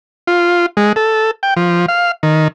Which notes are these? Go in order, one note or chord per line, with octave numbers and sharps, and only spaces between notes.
F4
G#3
A4
G5
F3
F5
D#3